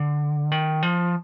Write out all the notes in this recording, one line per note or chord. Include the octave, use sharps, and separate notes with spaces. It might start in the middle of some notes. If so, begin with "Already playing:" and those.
Already playing: D3
D#3
F3